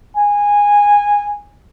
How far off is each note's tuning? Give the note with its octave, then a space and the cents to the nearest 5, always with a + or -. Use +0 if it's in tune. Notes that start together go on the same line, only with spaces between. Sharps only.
G#5 -15